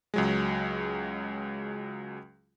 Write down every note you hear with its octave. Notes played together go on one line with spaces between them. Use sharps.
C#2 F#3 G#3